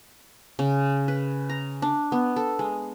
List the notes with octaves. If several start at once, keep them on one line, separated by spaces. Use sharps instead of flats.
C#3
B4
A#5
D4
B3
A4
G#3